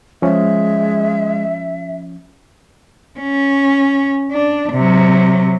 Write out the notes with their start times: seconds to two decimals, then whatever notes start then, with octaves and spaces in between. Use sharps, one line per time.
0.22 F3 G#3 C#4 E5
3.19 C#4
4.32 D4
4.72 C3 F#3